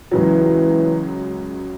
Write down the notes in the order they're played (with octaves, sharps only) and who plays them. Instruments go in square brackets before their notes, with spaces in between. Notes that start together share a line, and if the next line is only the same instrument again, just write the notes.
[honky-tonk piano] C#2 C#3 F#3 [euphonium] E3